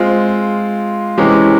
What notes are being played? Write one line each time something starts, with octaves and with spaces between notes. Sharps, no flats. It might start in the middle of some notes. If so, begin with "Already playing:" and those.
Already playing: G#3 C4 F4
C3 E3 G#3 C#4 G4